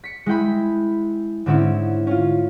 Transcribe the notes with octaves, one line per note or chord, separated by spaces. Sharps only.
B6 C#7
G#3 E4 G5 B5
G#2 D3 C4 C#4 D#4 E4
C#4 F4